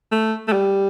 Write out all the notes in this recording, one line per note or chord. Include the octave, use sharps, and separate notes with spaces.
A3
A3
G3